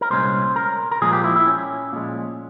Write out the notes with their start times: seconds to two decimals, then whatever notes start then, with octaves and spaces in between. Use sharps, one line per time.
0.01 A#4
0.10 C2 A#2 G#3 C#4 C5
0.56 A#4
0.91 A#4
1.02 A#2 F3 G#3 G#4
1.13 G4
1.24 E4
1.36 E4
1.47 C#4
1.93 A#2 F3 G#3